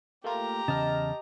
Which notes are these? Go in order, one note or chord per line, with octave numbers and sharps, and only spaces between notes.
A3 A#3 F4 G4 A#5
E2 C#3 D#5 A5 F6